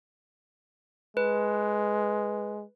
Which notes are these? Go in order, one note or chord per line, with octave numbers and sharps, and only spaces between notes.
G#3 B4